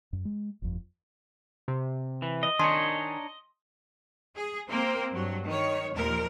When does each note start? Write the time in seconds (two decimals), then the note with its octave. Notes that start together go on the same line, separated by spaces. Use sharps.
0.13 F#2
0.25 G#3
0.62 G1 F2
1.68 C3
2.22 E3
2.43 D#5
2.59 D#3 D4 D#4 C#5 G#5 C6
4.36 G#4
4.67 A#3 C4 A#4 C5
5.11 G2 F#3
5.45 D#3 C#5
5.95 D#2 A#2 F3 A#4